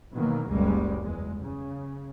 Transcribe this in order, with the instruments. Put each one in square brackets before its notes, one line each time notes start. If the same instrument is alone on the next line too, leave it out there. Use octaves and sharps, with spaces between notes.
[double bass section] B2 D#3 E3 F#3 A#3
F#1 C#2 G3 G#3 A#3
E2 G#3
C#3